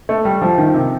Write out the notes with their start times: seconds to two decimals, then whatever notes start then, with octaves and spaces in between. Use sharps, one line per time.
0.09 A3
0.25 G3
0.42 F3
0.58 D#3
0.74 C3